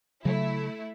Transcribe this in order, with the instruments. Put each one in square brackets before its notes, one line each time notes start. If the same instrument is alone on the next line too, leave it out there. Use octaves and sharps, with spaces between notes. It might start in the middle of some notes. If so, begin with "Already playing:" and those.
[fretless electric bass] C#3 F#3 [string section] A3 E4